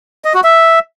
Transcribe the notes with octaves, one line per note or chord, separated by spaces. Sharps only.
D#5
F#4
E5